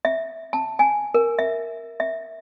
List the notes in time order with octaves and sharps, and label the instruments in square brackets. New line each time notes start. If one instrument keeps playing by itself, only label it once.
[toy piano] E5
A5
G#5
A#4
E5
E5